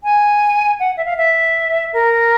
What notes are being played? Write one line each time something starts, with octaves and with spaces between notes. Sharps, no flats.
G#5
F#5
E5
F5
E5
A#4